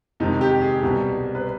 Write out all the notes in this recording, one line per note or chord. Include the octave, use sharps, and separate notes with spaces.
F2 C3 D#3 G#3 D#4
G4
G#4
C2 B2 G3
B4